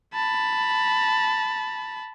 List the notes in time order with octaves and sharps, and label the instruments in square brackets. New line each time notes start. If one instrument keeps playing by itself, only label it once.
[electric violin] A5 B5